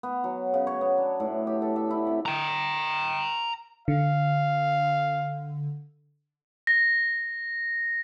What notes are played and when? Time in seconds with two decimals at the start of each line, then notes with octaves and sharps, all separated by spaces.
0.03 B3
0.24 F#3
0.54 C#3
0.67 C#5
0.81 B3
0.98 D4
1.20 A2
1.47 G4
1.62 A4
1.76 E5
1.91 E4
2.07 C3
2.26 G5 A#5
3.88 D3 F5
6.67 A#6